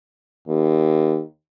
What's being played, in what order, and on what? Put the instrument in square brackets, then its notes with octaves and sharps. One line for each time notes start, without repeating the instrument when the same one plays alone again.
[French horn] D#2